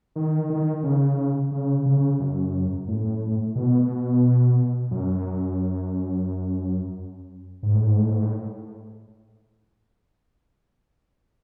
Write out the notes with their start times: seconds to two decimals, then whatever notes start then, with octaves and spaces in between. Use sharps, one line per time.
0.16 D#3
0.50 D#3
0.83 C#3
1.52 C#3
1.86 C#3
2.20 F#2
2.88 A2
3.55 B2
4.91 F#2
7.63 G#2
7.74 A2
7.86 G#2
7.98 A2
8.11 G#2
8.22 A2